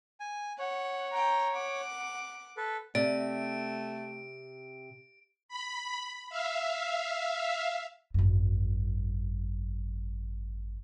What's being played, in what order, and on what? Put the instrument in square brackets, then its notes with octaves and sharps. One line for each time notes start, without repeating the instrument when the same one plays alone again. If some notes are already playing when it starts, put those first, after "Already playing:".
[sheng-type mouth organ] G#5
[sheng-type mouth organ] C#5 [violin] F#5
[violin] G5 A#5
F#5 D6
[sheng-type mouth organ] A4 B4
[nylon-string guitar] C3 [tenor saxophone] A3 [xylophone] D5 [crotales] D7
[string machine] B5
E5 F5
[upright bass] G#1 F#2